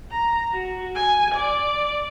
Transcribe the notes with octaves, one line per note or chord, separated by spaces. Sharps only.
A#5
F#4
G#5
D5